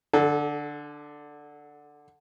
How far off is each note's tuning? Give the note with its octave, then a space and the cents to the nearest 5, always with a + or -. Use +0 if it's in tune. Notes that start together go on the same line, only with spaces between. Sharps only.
D3 +5 A4 -30